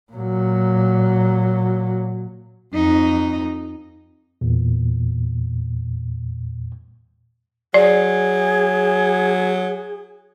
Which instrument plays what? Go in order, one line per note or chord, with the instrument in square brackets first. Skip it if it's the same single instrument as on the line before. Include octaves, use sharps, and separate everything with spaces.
[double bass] A#2 F#3
[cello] F2 D#4
[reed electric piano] E2 A#2
[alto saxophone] F#3 [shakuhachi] G#4 [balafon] D5